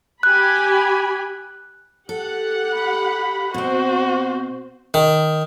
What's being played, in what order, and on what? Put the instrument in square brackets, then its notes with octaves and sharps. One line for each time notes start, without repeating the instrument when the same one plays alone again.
[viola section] G4 G#5 B5 [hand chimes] F#6
[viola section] G4 F#5 [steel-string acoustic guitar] A4
[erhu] B5
[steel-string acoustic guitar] B2 C4 [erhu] F#4 [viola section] C5
[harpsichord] D#3